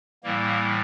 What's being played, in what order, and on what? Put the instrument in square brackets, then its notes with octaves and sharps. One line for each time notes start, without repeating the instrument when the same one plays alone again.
[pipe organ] A2 E3 G3 A#3